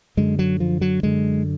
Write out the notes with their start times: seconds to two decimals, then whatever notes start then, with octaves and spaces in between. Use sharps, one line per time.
0.17 F#2 D3 G#3
0.39 F#3
0.60 F3
0.81 F#3
1.03 F#2 D3 G#3